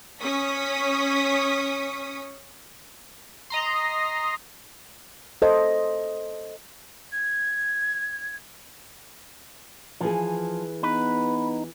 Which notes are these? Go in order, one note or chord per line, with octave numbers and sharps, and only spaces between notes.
C#4 C#6 D#6 B6
D#5 A#5 C6
A4 C5 D#5
G#6
E3 F3 G#4
B3 D#4 B4